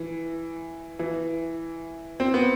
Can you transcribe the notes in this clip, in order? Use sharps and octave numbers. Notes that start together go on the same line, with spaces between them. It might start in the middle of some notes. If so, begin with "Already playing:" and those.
Already playing: E3
E3
C4
B3